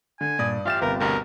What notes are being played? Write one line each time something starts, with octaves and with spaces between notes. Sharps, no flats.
D3 G#5
G2 A#2 D5 D#6
A1 F4 G4 E5 F5 A6 E7
G1 C2 A#4 B4
D2 G2 B2 A#4